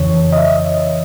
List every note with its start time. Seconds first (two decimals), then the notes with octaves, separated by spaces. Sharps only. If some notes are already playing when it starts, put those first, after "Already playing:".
Already playing: F2 C#3 E3 C#5
0.32 D#5
0.38 E5